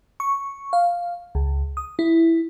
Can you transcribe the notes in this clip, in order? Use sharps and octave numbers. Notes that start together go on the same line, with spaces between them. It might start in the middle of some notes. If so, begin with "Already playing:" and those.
C#6
F5
C#2
D#6
E4